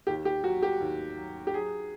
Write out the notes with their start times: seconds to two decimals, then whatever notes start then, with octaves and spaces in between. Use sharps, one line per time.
0.07 D#2 G4
0.25 G4
0.44 F#3 F#4
0.62 G4
0.81 D#2
1.17 F#3
1.47 G4
1.54 F#3 G#4